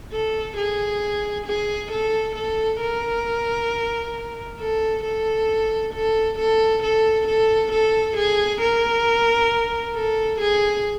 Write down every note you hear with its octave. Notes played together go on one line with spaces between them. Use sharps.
A4
G#4
G#4
A4
A4
A#4
A4
A4
A4
A4
A4
A4
A4
G#4
A#4
A4
G#4